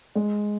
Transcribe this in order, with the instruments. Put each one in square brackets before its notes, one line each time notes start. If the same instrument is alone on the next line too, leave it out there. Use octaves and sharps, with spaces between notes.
[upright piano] G#3